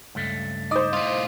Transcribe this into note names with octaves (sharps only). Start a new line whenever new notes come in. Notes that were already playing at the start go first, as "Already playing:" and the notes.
C#2 G2 A3
D#4 C5 D#5 D6 D#6
A2 F4